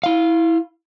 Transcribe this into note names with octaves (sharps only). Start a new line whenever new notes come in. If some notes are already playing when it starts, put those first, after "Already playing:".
E4 F5